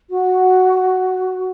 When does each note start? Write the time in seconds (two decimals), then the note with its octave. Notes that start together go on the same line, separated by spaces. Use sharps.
0.10 F#4